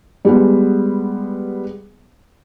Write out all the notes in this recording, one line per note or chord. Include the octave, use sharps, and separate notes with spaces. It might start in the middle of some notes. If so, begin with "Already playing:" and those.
G3 G#3 B3